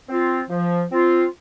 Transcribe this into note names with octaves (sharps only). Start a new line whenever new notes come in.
C4 F4
F3
C4 F4